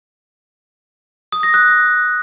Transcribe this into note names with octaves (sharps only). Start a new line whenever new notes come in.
D#6
A#6
F#6